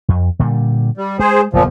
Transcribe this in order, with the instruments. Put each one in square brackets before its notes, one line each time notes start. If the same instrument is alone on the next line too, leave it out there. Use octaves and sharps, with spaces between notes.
[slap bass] F2
A#2 D3 G3
[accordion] G3
[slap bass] G#3 [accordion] G#4 C5
[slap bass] F#1 E2 B3 [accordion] A#2 F3